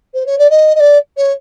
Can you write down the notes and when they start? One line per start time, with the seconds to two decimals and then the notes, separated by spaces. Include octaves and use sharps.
0.14 C5
0.26 C#5
0.38 D5
0.50 D#5
0.75 D#5
0.80 D5
1.17 C#5